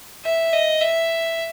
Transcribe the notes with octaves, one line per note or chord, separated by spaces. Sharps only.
E5
D#5
E5